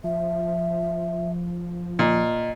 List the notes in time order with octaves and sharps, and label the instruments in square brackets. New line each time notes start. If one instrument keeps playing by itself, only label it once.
[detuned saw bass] F3 [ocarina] E5
[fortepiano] A#2 [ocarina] D#5